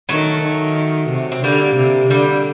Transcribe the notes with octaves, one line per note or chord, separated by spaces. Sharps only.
D#3 F#3 A3
D#3
C3
C4
D3 G3 A#3
C3
D3 G3 A#3